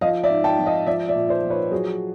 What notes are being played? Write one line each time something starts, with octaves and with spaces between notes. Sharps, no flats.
F3 D#5 F5
D5 E5
G#2
G5 A5
F3
D#5 F5
F3 D5 E5
D5 E5
A#2
C5 D5
F3
B4 C#5
F#3 F#4 G#4